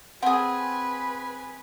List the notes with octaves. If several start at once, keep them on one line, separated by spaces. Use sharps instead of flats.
C4 G#4 B4 F#5 G#5